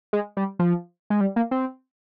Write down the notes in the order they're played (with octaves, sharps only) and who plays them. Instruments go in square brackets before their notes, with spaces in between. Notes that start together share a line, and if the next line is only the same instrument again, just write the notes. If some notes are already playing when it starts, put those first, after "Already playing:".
[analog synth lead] G#3
G3
F3
G#3
G3
A#3
C4